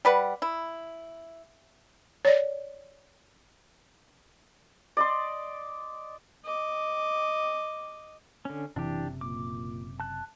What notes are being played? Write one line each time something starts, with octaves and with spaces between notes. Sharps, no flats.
G3 B4 F#5
E4
C#5 D5
D5 D#5 C6
D#5 D6
D3 C#4
F#1 C3 E3 D4 G4
A#2 D6
A5 F#6